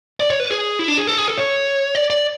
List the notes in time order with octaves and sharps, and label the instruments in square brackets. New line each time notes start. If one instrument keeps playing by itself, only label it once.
[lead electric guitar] D5
C#5
B4
G#4
E4
D4
G#4
A4
G#4
A4
C#5
D5
D5